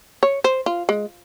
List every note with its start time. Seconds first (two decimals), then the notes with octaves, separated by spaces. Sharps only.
0.23 C#5
0.44 C5
0.66 F4
0.89 G#3